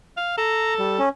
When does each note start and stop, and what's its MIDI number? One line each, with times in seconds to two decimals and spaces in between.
0.17 0.37 77
0.38 1.03 69
0.38 0.74 82
0.79 0.98 55
0.99 1.09 61